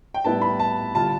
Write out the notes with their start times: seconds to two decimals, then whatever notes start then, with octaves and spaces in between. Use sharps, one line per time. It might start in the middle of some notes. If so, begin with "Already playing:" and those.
0.14 G5
0.24 A2 G3 B3 E4 A5
0.42 B5
0.59 A5
0.95 D3 G3 D4 F4 A5